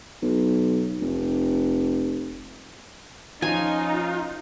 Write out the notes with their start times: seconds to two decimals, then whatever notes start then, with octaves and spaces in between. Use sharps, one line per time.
0.22 B1
1.01 F1
3.42 F3 C#4 D#4 F4 G#5